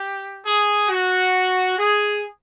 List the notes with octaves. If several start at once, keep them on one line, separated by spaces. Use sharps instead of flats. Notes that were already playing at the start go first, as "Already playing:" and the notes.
Already playing: G4
G#4
F#4
G#4